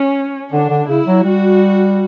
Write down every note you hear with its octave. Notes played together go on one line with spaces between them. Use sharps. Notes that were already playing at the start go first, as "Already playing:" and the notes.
Already playing: C#4
D3 D4
D3
C#3 E4
F#3
G3 F#4